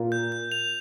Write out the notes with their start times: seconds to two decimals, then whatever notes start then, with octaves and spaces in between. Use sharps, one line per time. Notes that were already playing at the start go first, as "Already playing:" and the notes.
Already playing: A#2
0.12 G6
0.32 G6
0.52 F7